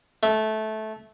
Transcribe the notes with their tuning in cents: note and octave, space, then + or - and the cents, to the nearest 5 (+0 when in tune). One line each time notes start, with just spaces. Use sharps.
A3 -15